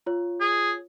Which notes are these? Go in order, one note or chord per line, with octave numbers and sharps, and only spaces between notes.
F4 C#5
G#4